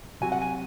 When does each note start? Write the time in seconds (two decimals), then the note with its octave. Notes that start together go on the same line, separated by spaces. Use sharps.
0.21 C3 F#3 C4 F#4 G#5
0.32 F#5
0.41 G#5